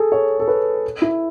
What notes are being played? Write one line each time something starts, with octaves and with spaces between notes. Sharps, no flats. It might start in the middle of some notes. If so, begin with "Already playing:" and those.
Already playing: G#4 A4
C#5
A4
B4
E4